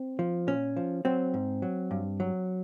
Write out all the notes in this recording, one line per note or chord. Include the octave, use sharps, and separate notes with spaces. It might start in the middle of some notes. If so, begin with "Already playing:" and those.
Already playing: C4
F3
A#2 C#4
F3
F#3 C4
G#2
F#3
G2
F#3